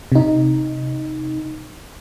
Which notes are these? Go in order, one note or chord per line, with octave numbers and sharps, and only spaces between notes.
C3 D#4